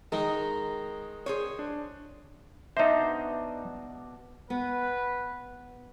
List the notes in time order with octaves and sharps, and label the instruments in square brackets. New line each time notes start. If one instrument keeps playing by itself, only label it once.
[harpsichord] D#3 D#4 [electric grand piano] G#3 [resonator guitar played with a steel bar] A#4
[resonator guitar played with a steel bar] G#4 C5 C#5
[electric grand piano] D4
[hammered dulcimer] B2 D4 [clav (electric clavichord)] D#4 C5 [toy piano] D#5 E5
[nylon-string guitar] B3 [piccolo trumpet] B4